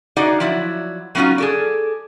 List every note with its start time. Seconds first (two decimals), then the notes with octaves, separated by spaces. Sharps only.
0.16 D#4 F#4 G#4 D5 D#5 F#5
0.40 F3 F#3 E4 D5
1.15 F#3 B3 C#4 D#4 F4 F#4
1.38 G#4 A4 D5